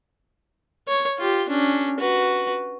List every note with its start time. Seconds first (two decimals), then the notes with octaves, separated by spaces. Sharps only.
0.88 C#5
1.18 F4 G4
1.49 C#4 D4
2.00 F#4 B4